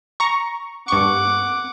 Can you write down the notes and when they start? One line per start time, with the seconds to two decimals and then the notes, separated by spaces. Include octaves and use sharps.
0.20 A#5 C#6
0.88 G2 F#5 C#6 D6